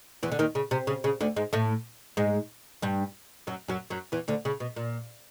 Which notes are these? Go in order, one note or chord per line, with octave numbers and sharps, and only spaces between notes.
E2 E3
D3
D#2 D#3
C#3
C3
C#3
C#3
D2 D3
G#2 G#3
A2 A3
G#2 G#3
G2 G3
F#2 F#3
F#2 F#3
F#2 F#3
E2 E3
D2 D3
C#3
B2
A#2